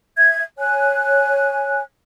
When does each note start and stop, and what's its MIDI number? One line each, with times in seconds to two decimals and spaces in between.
0.17 0.43 76
0.17 0.43 92
0.59 1.80 73
0.59 1.80 80
0.59 1.80 90